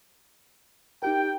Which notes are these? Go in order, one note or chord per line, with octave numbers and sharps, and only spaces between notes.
D#4 G4 A#4 G5